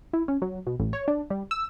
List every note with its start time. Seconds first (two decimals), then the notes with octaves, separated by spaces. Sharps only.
0.13 E4
0.28 C#4
0.42 F#3
0.67 B2
0.80 A1
0.93 C#5
1.08 D4
1.30 G3
1.51 E6